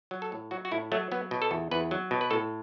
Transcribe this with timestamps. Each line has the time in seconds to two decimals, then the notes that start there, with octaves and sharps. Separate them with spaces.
0.11 F#3
0.22 A4
0.32 A2
0.51 F#3 F#4
0.65 F#4
0.71 A2 E4
0.92 F#3 A3
1.12 F#3 B3
1.31 B2
1.42 A4
1.51 E2
1.71 E2 B4
1.91 F#3
2.11 B2
2.21 B4
2.31 A2 A4